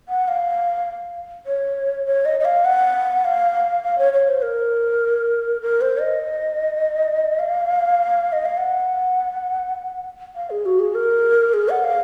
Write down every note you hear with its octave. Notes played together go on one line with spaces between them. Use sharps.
F#5
F5
C#5
C#5
D#5
D#5
F5
F#5
F5
F5
C#5
C#5
C5
A#4
A#4
C5
D#5
F5
D#5
F5
F#5
F5
G#4
F#4
G#4
A#4
G#4
F#5
F5